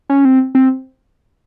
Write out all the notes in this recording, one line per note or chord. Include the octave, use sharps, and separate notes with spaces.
C#4
C4
C4